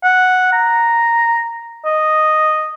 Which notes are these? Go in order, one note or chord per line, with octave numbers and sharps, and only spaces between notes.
F#5
A#5
D#5